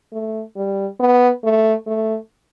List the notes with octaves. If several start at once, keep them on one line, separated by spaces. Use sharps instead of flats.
A3
G3
B3
A3
A3